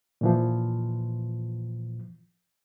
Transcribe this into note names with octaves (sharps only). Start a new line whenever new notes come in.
A#2 E3 F3